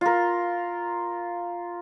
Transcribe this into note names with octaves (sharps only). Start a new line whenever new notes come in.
F4 A#4